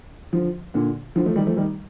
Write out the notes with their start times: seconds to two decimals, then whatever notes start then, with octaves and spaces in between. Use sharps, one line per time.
0.32 D3 F3
0.74 A#2 D3
1.15 D3 F3
1.26 F3 A3
1.36 D#3 G3
1.47 F3 A3
1.57 D#3 G3